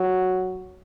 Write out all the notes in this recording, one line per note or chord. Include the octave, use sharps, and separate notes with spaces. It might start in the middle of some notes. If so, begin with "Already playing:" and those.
Already playing: F#3